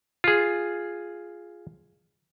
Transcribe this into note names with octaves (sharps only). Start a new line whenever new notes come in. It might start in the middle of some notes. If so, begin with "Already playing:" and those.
F4 G#4